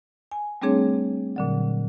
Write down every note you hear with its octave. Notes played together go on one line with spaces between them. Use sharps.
G#5
G3 A3 C4 D4 G#4 C#5
A#2 D3 F#3